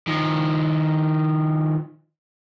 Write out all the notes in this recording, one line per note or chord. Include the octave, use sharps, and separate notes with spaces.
D#3 F3